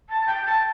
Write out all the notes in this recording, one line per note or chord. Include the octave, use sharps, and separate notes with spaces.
A5
G5
A5